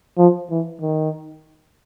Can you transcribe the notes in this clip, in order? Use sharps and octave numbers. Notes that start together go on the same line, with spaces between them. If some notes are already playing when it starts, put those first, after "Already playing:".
F3
E3
D#3